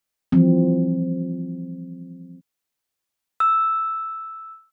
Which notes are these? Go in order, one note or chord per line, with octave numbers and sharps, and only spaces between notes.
E3 F3 G3 C4
E6